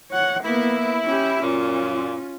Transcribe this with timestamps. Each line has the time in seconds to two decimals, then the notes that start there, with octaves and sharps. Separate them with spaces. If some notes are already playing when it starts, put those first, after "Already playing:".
0.11 C#5 F#5
0.44 A#3 B3 E4
1.05 C#4 G4
1.42 F#2 A#2 C#4 F4